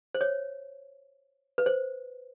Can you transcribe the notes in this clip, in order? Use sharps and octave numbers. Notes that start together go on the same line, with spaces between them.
C5
C#5
B4
C5